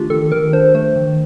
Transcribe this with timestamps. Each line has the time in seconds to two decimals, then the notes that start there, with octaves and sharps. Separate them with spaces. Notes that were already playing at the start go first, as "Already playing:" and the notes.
Already playing: D#3 A3 D4 F4 G4
0.10 D#3 A4
0.32 D#3 A#4
0.53 D4 C5
0.75 A3 C5
0.96 D#3